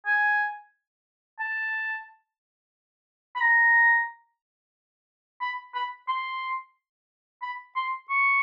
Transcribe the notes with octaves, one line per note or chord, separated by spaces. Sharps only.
G#5
A5
B5
A#5
B5
B5
C6
B5
C6
C#6